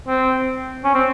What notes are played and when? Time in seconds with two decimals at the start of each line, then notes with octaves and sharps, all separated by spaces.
0.08 C4
0.84 C#4
0.94 C4